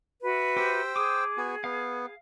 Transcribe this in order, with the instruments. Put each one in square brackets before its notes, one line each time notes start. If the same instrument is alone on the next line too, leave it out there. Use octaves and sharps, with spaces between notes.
[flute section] F#4 B4 E5
[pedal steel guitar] G4 [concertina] C5 G5 E6
[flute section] G#4 [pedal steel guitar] D6 D#6
[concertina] B3 F#4 G#5
[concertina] B3 [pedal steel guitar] F5